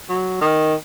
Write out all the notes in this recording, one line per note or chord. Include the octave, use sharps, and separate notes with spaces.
F#3
D#3